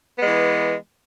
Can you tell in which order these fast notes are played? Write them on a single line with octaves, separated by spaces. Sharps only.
B3 G#3 E3